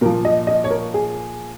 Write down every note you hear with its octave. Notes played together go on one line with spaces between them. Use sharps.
A#2 F3 A#4
D#5
D#5
C#5
A#4
G#4